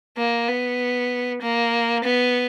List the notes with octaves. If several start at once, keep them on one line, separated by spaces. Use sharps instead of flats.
A#3
B3
A#3
B3